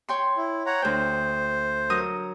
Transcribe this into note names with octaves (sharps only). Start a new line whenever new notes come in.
C#5 G5 C6
E4
C#5 F#5 A#5
D2 C5 G5
F#3 A#4 D#6